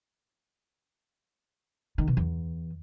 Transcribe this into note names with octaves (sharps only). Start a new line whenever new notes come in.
D#3
B2
E2